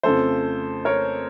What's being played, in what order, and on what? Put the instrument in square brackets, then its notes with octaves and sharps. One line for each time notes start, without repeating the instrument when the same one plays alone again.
[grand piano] F2 C#3 F3 A3 A4 C5
A#4 C#5